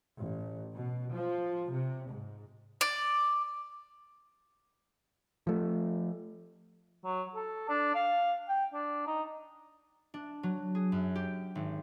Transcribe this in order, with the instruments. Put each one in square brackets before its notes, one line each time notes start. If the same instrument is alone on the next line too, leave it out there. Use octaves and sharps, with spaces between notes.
[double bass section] A1
B2
F3
C3
G#2
[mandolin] D5
[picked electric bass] F3 A3
[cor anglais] F#3
A4
D4
F5
G5
D4
D#4
[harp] D4
F#3
G#4
F#2
G4
G#1